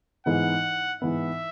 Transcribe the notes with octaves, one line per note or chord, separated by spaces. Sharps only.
G#2 E3 B3 F#5
G#2 E3 B3 E5